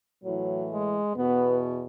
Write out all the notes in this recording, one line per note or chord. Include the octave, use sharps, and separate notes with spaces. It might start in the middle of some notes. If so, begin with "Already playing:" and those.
A2 E3 F#3
G#3
E2 B2 B3